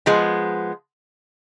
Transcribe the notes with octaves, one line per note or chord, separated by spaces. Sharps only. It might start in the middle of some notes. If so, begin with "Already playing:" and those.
F3 G#3 B3